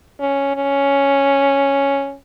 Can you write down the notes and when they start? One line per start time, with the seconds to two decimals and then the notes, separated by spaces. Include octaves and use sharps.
0.20 C#4
0.55 C#4